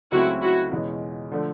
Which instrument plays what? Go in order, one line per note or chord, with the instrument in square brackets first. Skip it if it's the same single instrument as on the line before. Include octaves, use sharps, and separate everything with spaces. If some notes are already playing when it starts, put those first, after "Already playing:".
[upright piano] C#2 C#3 F#3 A3 C4 [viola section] E4 F#4
[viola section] E4 F#4
[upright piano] E2 B2 G#3 C#4 F#4
D3 F3 A3 D4